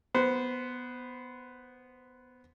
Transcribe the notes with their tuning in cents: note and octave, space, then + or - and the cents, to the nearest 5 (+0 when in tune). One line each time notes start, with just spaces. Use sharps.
B3 +0 C5 -20